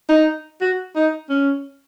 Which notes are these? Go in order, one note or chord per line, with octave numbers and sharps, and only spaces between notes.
D#4
F#4
D#4
C#4